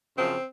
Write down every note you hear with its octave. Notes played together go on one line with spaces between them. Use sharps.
F#2 C#3 F3 C4